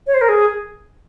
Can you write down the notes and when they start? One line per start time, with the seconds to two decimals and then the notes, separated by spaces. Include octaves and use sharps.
0.07 C#5
0.14 C5
0.21 A#4
0.29 G#4